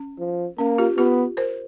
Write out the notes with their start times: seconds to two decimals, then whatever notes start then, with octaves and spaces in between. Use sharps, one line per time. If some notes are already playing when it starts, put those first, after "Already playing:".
Already playing: C#4
0.19 F3
0.58 A#3 C#4
0.78 F4 G4
0.98 B3 F4 G4
1.37 A#4 C5